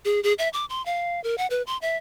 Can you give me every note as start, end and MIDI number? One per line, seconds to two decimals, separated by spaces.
0.05 0.22 68
0.23 0.33 68
0.39 0.49 76
0.53 0.65 86
0.70 0.84 84
0.86 1.22 77
1.24 1.38 70
1.38 1.47 78
1.50 1.62 71
1.67 1.77 84
1.82 1.97 76